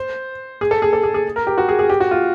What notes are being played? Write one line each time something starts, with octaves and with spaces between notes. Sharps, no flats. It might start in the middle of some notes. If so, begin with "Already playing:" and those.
Already playing: C5
G#4
A4
G#4
A4
G#4
G#4
A#4
G4
F#4
G#4
G#4
G4
F#4
F4